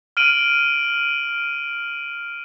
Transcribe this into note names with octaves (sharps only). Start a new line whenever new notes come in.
F6 D7 D#7 F#7